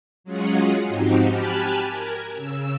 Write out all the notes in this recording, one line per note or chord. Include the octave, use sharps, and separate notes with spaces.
F#3 G#3 C#4 F4 G#4 F#5
G#2 F3 C4 D#4 F#4 G4
G4 G#5 A5 B5 F6 F#6
A#4 G#6
C#3 E6